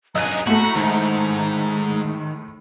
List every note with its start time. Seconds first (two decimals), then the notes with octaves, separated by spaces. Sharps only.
0.15 B1 G#4 D#5 A#5 F#6
0.47 A2 A3 F#4
0.76 G#2 D#3